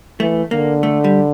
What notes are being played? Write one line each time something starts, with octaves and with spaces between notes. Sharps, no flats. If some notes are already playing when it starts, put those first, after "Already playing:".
E3 A3
D3 A#3
A3
G3